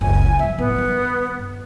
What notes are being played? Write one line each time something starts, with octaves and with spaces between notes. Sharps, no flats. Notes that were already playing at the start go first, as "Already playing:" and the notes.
F#1 C#2 G#5
F3 G#3 E5
A2 B3 C4
G2 D#3